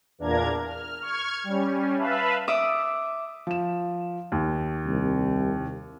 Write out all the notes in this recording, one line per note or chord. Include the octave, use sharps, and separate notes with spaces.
E2 A#2 D4 A#4 A#5 G#6
F6
C#6 F6 G#6
G3 C#4
B4 E5 F5 A5 B5
E5 D6 D#6
F3 E7
D#2
C2